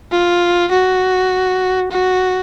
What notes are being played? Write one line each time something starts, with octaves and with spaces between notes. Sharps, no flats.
F4
F#4
F#4